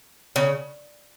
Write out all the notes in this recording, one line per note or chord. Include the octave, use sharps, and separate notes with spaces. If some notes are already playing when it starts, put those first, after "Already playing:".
C#3